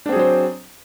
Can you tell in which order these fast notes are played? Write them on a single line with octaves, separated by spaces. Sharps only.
D4 C4 G#4 F#3 C5